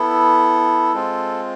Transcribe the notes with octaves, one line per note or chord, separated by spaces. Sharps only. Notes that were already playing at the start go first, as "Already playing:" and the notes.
Already playing: B3 E4 A4
G#3 C4 F4